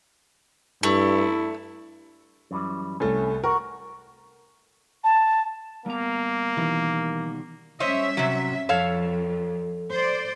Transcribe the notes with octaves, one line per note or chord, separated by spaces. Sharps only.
G2 A3 E4
F#2 E3 G3
C2 A3 C#4
F#4 A#4
A5
G3 A#3 B3 A#5
B2 D#3 E3 G3
G3 C#4 C5 C#5 D#5 E5
C3 F#3
F2 A4 C#5 F5
C5 D5